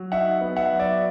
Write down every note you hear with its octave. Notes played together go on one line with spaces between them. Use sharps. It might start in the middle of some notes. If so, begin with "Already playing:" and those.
Already playing: F#3
D#4 E5 F#5
B3
E5 F#5
F#3
D5 E5